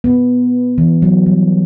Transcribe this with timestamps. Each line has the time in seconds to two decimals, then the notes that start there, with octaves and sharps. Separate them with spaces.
0.04 B3
0.78 E3
1.02 F#3
1.26 G3